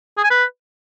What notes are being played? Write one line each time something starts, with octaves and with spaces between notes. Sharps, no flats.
G#4
G#5
B4